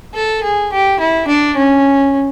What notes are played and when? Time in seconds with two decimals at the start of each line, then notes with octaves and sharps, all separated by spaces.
0.15 A4
0.43 G#4
0.72 G4
1.00 E4
1.28 D4
1.56 C#4